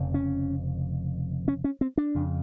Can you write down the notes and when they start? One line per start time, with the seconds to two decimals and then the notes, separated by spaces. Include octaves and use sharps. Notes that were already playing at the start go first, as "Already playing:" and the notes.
Already playing: F1 F2 C#3
0.14 C#4
1.48 C#4
1.64 C#4
1.81 C4
1.98 D4
2.15 F2 C#3